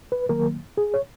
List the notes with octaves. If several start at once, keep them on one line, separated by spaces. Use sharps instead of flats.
B4
D#3 F#3 A#3 A#4
G#4
C#5